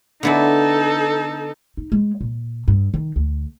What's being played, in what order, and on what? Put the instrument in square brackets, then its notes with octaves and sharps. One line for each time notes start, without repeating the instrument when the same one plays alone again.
[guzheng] D3 B3 E4 [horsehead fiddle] D#4 A4
[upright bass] D#4
G#3
A#2
G2
D#3
D2